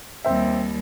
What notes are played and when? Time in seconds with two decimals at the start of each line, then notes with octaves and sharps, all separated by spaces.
0.24 D#2 G3 C4 E5